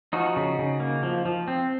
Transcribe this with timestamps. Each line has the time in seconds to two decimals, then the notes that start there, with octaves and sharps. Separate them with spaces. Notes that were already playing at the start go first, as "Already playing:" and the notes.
0.13 F3 D#4 F#4
0.36 C#3
0.59 C#3
0.80 A#3
1.03 F3
1.25 F3
1.48 C4